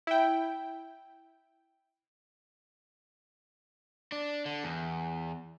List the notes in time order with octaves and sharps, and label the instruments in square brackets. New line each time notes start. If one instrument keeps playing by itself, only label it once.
[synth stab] E4 G5
[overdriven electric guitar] D4
D3
E2